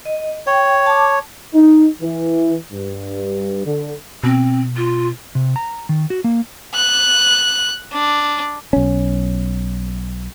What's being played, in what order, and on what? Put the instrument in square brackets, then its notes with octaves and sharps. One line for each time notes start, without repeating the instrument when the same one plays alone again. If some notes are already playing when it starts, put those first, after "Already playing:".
[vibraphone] D#5
[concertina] C#5 [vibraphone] G5
[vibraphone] A5 D6
[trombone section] D#4
E3
G2
D3
[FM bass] B2 [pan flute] C4
[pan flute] F4
[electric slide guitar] C3
A#5
D#3
F#4
A#3
[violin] F#6
D4
[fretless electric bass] B1 C#4